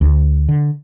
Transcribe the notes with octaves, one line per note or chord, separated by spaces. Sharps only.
D2
D3